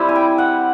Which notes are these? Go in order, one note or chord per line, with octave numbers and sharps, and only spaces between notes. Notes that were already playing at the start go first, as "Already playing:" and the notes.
Already playing: G3 C4 E4
G#5
G5
F#5